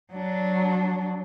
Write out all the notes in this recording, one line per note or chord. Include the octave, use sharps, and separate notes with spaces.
F#3 D4